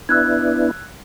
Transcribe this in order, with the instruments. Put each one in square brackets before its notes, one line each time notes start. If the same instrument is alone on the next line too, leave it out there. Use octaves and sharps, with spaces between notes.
[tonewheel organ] B3 D4 E4 [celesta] E6 F#6 G#6